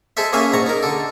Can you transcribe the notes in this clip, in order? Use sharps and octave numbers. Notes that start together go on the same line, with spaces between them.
G#3 A4 C5 E5
A#3 C#4 G#4 E5 F5
A#1 G#2 A#5 C#6
D#4 A#4
D3 A4